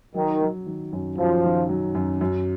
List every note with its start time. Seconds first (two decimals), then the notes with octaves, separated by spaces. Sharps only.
0.15 D#3 F#3
0.41 F#3
0.67 D#3
0.93 F#2
1.17 F#2 F3
1.44 D#3
1.69 F#3
1.95 F#2
2.21 F#2